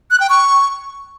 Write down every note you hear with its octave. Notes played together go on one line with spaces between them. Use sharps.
F#6
G5
C#6